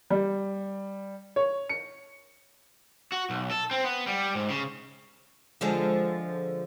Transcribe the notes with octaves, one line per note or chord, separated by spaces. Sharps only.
G3
C#5
C#7
F#4
B1
A4
C4
B3
G3
G#2
C#3
D3 F3 G#3